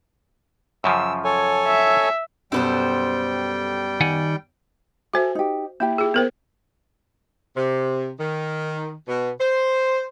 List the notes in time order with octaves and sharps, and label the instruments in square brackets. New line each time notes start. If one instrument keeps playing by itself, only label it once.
[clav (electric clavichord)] F#2 C#3 F3 [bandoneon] E6
[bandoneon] A4 C#5 G#5
[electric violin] E5
[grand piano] F#2 B2 B3 [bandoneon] G3 G5 [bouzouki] A4 B4 C5
[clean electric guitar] D#3 F#5 G#5
[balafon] F#4 C5 E5 [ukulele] A4 G#5
[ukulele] D#4 G4
[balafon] A#3 [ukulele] E4 G4 G5
[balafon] F4 G#4
B3 A#4 C5
[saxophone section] C3
D#3
B2
C5